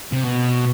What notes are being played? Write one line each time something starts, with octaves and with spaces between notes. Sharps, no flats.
C3
B2